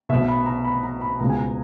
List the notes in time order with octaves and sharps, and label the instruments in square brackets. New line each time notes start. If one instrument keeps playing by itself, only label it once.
[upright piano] B1 B2 E5
B5
A#5
B5
A#5
B5
C#2 B2 A#5
G#5
A#5